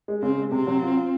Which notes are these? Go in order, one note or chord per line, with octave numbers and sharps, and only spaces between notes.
G#3
C#3 C4
G#3
C3 C4
F#3
F4
F4